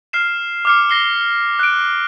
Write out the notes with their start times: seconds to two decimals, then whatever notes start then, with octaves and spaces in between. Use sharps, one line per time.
0.13 F6 C7 E7
0.65 D6 F6 C#7
0.90 A#6 C7 G7
1.59 F#6 D7